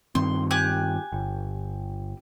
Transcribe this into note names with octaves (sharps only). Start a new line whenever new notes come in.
G2 D#3 C4 C6
G4 G#5 F#6
G1